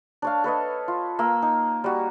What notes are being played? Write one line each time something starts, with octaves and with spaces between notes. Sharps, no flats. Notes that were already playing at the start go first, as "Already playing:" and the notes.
D4 C#5 F5
A4 B4 C#5 D#5
F4
A#3 F5 E6
D#4
G3 F#4